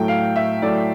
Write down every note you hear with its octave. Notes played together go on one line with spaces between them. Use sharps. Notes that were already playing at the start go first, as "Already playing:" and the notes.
Already playing: A2 F#3 A3 G5
F5
E5
A2 F#3 A3 D5